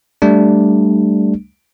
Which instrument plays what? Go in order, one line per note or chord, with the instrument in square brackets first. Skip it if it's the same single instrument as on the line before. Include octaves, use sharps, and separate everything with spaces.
[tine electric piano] G3 A3 D4